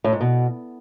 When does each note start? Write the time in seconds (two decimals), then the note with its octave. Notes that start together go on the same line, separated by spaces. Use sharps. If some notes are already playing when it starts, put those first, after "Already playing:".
0.04 A2
0.13 G#2
0.21 B2